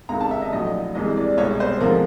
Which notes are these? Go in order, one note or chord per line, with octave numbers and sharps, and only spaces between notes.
C#2 C3 D#3 A#5
A5
E5
D#5
A#1 A2 F#3 D#5
C2 C3 E3 G#3 D#5
D5
C2 B2 G#3 C#5
C5
D2 C3 F3 G#3 A#4